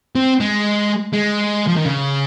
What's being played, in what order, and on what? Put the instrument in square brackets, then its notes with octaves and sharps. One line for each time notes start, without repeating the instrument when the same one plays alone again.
[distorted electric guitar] C4
G#3
G#3
F3
D#3
C#3